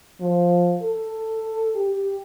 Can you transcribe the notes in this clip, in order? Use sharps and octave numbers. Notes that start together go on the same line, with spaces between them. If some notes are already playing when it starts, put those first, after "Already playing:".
F3
A4
G4